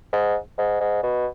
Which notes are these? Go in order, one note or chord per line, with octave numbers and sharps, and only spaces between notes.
G#2
G#2
G#2
B2